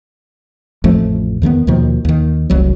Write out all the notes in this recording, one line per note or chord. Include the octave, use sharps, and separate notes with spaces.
A1 F2 F3 A3
E2 D#3 A#3 B3
D#2 B2 D#3 F3
D#2 D#3
F1 C2 F#3